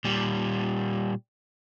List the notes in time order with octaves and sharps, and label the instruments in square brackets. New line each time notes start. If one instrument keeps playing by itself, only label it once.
[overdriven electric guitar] A#2 G3